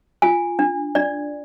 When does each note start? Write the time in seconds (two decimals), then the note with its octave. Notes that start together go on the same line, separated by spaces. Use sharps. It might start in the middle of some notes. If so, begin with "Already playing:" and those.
0.22 F4 G#5
0.59 D4
0.95 D4 D5